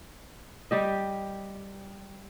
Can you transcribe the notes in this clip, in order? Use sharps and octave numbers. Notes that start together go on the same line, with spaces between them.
G3 G4 D#5